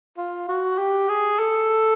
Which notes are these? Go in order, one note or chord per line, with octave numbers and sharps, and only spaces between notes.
F4
F#4
G4
G#4
A4